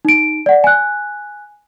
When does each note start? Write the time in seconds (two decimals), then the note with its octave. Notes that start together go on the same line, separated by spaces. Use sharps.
0.05 D#4 D7
0.46 D5 F#5
0.64 G#5 F#6